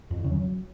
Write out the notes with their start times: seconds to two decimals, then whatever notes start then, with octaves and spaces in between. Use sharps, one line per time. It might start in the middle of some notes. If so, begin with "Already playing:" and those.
0.11 F2
0.17 E2
0.24 C#3
0.31 F#3